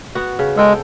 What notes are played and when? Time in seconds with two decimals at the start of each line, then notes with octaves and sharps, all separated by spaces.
0.15 B3 F#4
0.39 C#3
0.57 G#3 A4 G5